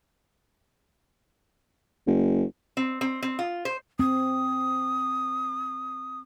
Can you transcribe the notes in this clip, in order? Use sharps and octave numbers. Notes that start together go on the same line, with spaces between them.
F#1
C4
C4
C4
F4
C5
C4 D#6